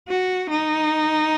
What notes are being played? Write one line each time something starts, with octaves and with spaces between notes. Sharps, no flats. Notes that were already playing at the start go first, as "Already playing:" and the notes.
F#4
D#4